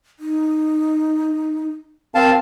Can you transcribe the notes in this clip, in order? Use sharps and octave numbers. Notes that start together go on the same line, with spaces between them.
D#4
C4 A#4 F5 A5